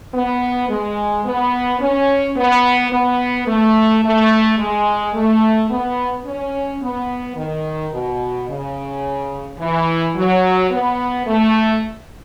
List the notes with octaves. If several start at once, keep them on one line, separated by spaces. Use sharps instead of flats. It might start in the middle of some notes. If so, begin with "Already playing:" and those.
B3
G#3
B3
C#4
B3
B3
A3
A3
G#3
A3
B3
C#4
B3
D#3
B2
C#3
E3
F#3
B3
A3